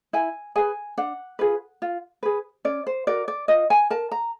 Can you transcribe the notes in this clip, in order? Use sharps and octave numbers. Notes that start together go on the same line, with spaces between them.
E4 G#5
G#4 B4 G#5
D4 F#5
F4 G#4 B4
F4
G#4 B4
C#4 D5
C5
F#4 A#4 D5
D5
F4 D#5
G#5
A#4 A5
A#5